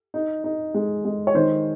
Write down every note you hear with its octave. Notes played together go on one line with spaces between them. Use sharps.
D#4
D#4
G#3
G#3
C#5
D#3 C5